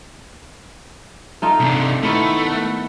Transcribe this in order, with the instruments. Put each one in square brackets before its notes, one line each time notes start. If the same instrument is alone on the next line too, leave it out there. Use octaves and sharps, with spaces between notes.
[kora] A3 D#4 F4
[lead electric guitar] C3 D4
[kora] D#3 B3 E4 [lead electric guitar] A3
[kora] F#5